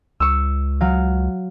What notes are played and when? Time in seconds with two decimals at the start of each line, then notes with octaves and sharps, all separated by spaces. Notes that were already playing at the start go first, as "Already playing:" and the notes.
0.20 C#2 C#6 E6
0.81 F#3 F5